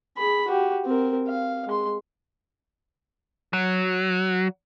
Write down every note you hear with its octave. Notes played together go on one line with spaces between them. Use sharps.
G#4 B5
F#4 G4
C4 A#4
F5
G#3 C6
F#3